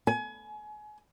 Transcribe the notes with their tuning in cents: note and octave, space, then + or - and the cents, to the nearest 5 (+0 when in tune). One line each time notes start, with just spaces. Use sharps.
G#5 +30